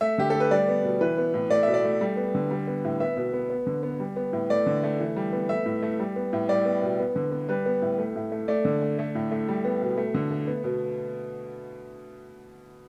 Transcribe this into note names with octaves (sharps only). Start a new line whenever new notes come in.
A3 E5
D3 G4
A4
A3
B4
G3 D5
B3
B2
E3 B4
B3
A2
A3 D5
B2 E5
D5
A3
G3
B3
D3
G3
B3
A2
B3 E5
B2
B3
B3
D3
B3
G3
B3
A2
A3 D5
D3
A3
E3
G3
B3
A3 E5
A2
A3
G3
B3
A2
G3 D5
B3
B2
B3
D3
B3
G3 B4
B3
A2
A3
A2
A3
A3 D5
D3
A3
A3
A2
A3
G3
B3
B2
A3
D3
A3
B3
B2